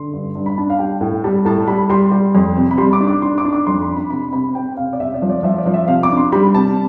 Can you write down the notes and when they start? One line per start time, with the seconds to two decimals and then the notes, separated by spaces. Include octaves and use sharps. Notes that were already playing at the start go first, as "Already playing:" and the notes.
Already playing: D3 C6
0.13 G2
0.35 G2
0.46 B5
0.58 D4 A5
0.70 F5
0.79 G3 G5
1.01 A2 G5
1.24 G3 A5
1.45 A2 A5
1.68 G3 B5
1.90 G3 C6
2.11 G3
2.35 F2
2.56 C3
2.71 B5
2.78 G3 C6
2.93 D6
3.00 D4
3.07 D6
3.22 D4 C6
3.38 D6
3.45 D4
3.53 D6
3.67 F2 C6
3.82 B5
3.89 D4
3.97 B5
4.10 C3 B5
4.33 C3 B5
4.55 C4 G5
4.77 C3 F5
4.93 D5
5.00 C3 E5
5.14 D5
5.22 F3
5.30 D5
5.43 F3 E5
5.58 D5
5.66 F3
5.74 E5
5.87 C3 F5
6.03 D6
6.10 D4
6.17 C6
6.32 G3 B5
6.55 C3 A5